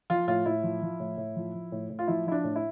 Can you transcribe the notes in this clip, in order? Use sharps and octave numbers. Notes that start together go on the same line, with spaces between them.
F3 F4
A2 F4
A2 E4
F3
F3
A2
A2
F3
F3
A2
A2
F4
F3 E4
F3 E4
D4
A2
E4